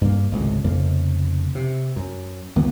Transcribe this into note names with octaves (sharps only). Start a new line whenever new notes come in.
G2 A#3
G#1 C#2 A2 C3
F1 F2 C#3 A#3
C3
F#2
C#2 D#3 A#3 B3